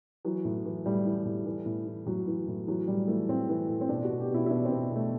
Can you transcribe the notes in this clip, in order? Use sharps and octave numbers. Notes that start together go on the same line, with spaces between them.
E3 F#3
A2
E3
A2 G3
E3
A2
E3
A2
E3
A2 F#3
E3
A2
E3 F#3
A2 G3
E3 A3
A2 C4
E3
A2
C4
B2 D4
F#4
B2
G4
B2 E4
E4
B2 D4
B2 C4
B2 A3